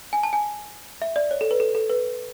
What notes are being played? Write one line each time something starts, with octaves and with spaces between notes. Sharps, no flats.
G#5
A5
G#5
E5
D5
C#5
A4
B4
A4
A4
B4